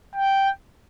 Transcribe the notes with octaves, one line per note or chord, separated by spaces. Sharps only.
G5